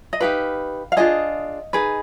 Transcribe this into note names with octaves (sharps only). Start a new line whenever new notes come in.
D#5
D#4 G4 B4 F5
F5
D4 F4 G#4 D#5
D#4 G#4 B4